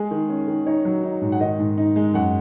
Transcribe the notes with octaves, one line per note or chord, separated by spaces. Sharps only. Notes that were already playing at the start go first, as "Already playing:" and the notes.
Already playing: G#3 G#4
D#3
C#4
D#3
D#4 C#5
F#3
D#4
G#2
F#5
D#3 D#5
G#2
D#4
G#3
F#2 F#5